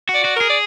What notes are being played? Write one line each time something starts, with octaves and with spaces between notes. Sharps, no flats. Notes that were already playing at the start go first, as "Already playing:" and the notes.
F#4
D5
F#4
G#4 A#4
D5